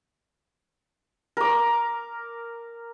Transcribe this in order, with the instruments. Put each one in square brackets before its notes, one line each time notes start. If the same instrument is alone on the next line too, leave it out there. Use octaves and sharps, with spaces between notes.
[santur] A#4 D6